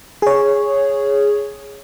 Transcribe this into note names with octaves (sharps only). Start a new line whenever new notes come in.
G#4 C#5